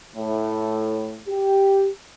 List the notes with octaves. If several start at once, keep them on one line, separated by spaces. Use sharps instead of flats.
A2
G4